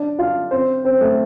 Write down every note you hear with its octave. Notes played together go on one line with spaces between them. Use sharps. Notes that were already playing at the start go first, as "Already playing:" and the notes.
Already playing: D4 D5
F4 F5
C4 C5
C4 C5
A3 A4